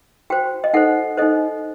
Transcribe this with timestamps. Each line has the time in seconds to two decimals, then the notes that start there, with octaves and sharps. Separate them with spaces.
0.30 F#4 C5 G5
0.64 D#5
0.73 D#4 A4 C5 F#5
1.17 D#4 A4 C5 D#5